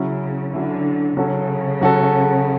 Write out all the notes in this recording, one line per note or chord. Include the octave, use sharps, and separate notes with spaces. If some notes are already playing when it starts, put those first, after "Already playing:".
Already playing: C#3 F#3 C#4 E4
D3 F#3 C#4 E4
C#3 F#3 C#4 F#4 A4
F#3 C#4 F#4 A4